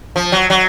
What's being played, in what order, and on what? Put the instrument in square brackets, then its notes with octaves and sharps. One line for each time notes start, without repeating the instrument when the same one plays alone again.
[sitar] F3
F#3
F#3